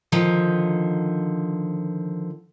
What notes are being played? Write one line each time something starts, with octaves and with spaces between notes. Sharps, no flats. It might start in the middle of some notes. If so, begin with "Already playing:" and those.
D3 D#3 F3